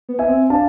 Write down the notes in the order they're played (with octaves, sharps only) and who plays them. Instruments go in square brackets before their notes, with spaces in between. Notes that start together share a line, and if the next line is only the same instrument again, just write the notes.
[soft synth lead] B3
[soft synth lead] B3 [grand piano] E5 G#5
[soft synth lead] C4
[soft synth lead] D4 [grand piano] F5 A5